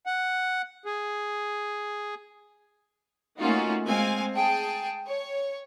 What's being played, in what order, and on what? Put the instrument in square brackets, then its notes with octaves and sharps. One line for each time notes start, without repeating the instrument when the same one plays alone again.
[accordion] F#5
G#4
[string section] A3 A#3 C#4 D#4 F4 F#4
G#3 C4 F5 G#5
G#4 G5 A5
C#5